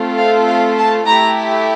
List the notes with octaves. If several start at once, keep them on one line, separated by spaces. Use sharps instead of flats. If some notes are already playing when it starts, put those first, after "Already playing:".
Already playing: A3 C4 F4 A4
F5
F5
A5
A3 E4 G4 A#5